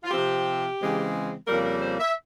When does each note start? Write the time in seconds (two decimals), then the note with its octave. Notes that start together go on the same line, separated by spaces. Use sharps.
0.04 F4
0.11 C3 F3 C4 G4
0.80 C#3 E3 G#3 C4
1.48 F2 C#3 G3 A#3 A#4
1.65 A#4
1.82 C5
2.00 E5